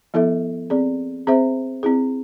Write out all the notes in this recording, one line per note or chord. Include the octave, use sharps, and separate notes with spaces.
F3 B3 E4 A4 E5
C4 G#4 D5
C4 G#4 C5 E5
C4 E4 G#4